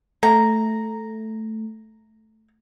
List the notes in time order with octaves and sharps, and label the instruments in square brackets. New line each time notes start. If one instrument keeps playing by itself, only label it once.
[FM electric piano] A3 [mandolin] A#5